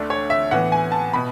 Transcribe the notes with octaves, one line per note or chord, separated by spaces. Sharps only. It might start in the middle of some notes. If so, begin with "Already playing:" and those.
Already playing: D2 D3 A3 D4 D5
C#5
E5
A2 E3 B3 F#5
G#5
A5
B2 B5